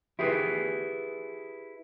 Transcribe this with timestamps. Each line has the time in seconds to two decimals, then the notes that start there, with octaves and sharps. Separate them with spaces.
0.19 E4 G4 G#4 B4